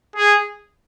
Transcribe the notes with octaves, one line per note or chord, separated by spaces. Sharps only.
G#4